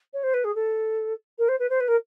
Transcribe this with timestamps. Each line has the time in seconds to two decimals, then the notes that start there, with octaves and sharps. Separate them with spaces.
0.13 C#5
0.23 C5
0.34 B4
0.44 G#4
0.55 A4
1.39 A#4
1.48 C5
1.59 B4
1.70 C5
1.80 B4
1.88 A#4